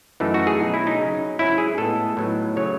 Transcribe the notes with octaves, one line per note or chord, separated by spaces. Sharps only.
F#2 E3 A3 D#4
F#4
G#4
B2 F#3 A3 C#4 D#4
E4
D#4
C#3 F#3 C#4
G#2 F#3 C#4 E4
G#4
A2 G#3 B3 A4
A2 F#3 B3 D#4
C#3 F#3 A3 C#4 C#5